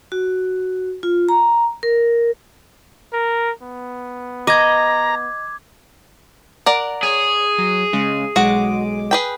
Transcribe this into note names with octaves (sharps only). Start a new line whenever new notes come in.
F#4
F4
A#5
A#4
A#4
B3
D#5 A#5 D6 G#6
A#4 D5 F#5
G#4 C#5
F#3
C#3 G#3
B1 G#3 F#4 F#5 D6
G#4 B4 G5